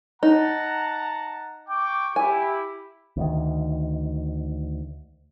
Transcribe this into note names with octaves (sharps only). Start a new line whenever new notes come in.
D#4 F#5 A5 A#5
G5 C#6 D6
E4 G4 G#5
D2 D#3